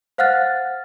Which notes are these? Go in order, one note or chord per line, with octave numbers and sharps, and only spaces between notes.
C5 F5 F#5 F6 F#6 A6